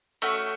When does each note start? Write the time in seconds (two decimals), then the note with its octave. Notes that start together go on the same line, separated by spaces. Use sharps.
0.22 A3 C#4 F#4 E5